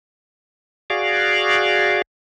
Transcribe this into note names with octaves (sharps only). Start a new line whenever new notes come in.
F#4 G#4 D5 F5